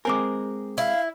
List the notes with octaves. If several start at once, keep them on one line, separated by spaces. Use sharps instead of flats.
G#3 C4 A#4 G#5 D6
E4 F5